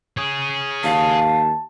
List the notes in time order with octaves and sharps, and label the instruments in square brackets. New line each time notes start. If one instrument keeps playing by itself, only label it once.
[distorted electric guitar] G#4 C#5
[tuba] D#2 [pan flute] F5 [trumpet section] A5